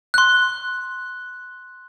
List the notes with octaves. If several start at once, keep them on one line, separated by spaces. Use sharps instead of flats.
C6 F#6